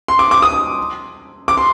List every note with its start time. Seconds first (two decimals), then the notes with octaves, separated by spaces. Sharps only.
0.08 C6
0.19 D6
0.31 D6
0.42 D#6
1.48 D6
1.58 C6